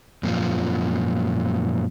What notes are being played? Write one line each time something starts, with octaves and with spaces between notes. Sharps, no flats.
F#2 A#2 F3